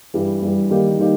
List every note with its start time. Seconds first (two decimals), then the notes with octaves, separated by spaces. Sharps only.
0.14 G2 E3 G3
0.42 G2 E3 G3
0.70 D#3 G3 A#3 D#4 G4
0.98 D#3 G3 A#3 D#4 G4